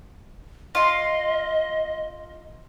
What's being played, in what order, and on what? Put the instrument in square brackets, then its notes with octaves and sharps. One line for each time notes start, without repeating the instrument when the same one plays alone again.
[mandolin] F4 C6 [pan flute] D#5